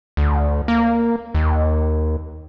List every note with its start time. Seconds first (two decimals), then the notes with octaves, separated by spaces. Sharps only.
0.17 D2
0.68 A#3
1.35 D#2